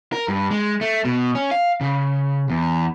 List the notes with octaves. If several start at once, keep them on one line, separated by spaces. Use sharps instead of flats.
A#4
G2
G#3
A3
B2
C#4
F5
C#3
E2